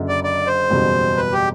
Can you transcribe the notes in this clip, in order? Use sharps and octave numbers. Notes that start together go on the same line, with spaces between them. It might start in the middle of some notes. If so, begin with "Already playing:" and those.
Already playing: F#1 F#2 D3
D5
D5
C5
F#1 E2 B2 G3
B4
G4